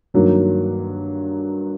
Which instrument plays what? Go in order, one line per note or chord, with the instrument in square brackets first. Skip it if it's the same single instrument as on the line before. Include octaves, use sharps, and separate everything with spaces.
[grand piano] G2 D#3 F#3 A#3